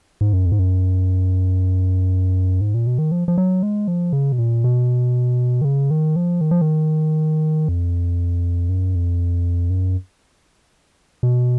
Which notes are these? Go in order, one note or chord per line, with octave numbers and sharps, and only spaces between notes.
G#2
F#2
F2
G#2
F#2
G#2
A#2
B2
D#3
F3
F3
F#3
G#3
F3
C#3
B2
A#2
B2
D#3
C#3
D#3
F3
D#3
F3
D#3
F2
F#2
F2
F#2
B2